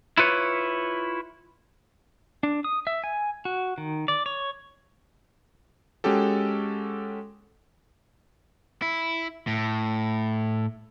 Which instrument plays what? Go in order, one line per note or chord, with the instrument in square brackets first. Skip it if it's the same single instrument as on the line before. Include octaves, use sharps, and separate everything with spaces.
[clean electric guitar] E4 F4 B4 C#5
[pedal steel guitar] D4
D#6
E5
G#5
F#4
D#3
D5
C#5
[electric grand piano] G#3 C#4 F#4 G4 A4
[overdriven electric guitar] E4
A2